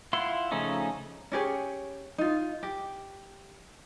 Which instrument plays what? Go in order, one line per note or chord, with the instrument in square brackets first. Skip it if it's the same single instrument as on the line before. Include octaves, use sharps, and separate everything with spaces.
[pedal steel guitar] E4 F4 F#5 C6
C#3 F3 A3 C#4 D#4
[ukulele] C#4 G4 G#4 C#5
D#4 F4
G4